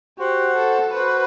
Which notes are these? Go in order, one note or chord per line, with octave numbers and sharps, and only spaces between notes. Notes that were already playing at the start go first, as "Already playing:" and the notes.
F#4 G4 C5 F#5
A4
F#4 B4 C5 F#5